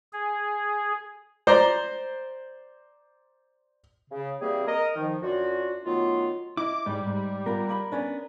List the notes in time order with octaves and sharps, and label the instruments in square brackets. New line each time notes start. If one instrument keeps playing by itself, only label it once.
[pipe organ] G#4
[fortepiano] C5 D5 A#5
[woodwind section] C#3
E3 G3 A#3 C4 G#4
A#4 D#5
D#3 F3
F#2 D4 F4 F#4
D#3 F#3 A3 B3 F4
[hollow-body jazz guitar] E4 D#5 [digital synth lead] D6
[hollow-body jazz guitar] G#2 [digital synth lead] G3
[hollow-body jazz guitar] G#2
[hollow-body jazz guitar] B3 F4 [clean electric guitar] A#4
[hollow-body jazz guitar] A#3 B5
B3 C#4 D4